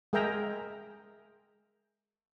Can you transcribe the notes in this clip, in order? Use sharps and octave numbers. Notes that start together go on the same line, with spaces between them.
G#3 G#4 A#4 E5 G5 A#5